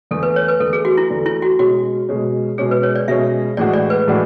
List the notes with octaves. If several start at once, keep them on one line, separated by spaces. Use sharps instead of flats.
E2 D3 A3 A4
B4
C#5
B4
E2 D3 A3 A4
G#4
F#4
E4
E2 D3 A3
E4
F#4
B2 G#3 C#4 F#4
B2 G#3 C#4
B2 G#3 C#4 G#4
B4
C#5
D5
B2 G#3 C#4 E5
A2 E3 G#3 D4 F#4 D5
D5
B4
A2 E3 G#3 D4 F#4